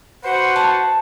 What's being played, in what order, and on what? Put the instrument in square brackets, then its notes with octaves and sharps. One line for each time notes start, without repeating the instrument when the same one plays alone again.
[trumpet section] F#4 B4 C5 [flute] F#5
[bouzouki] A5